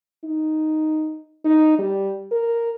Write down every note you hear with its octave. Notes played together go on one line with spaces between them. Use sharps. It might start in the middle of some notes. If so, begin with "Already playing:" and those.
D#4
D#4
G3
A#4